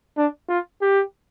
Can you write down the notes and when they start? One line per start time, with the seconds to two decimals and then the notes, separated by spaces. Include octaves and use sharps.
0.17 D4
0.49 F4
0.82 G4